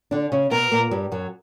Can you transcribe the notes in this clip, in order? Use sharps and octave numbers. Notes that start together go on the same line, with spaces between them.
D3 D4
C#3 C#4
B2 B3 A#4
A#2 A#3
G2 G3
F#2 F#3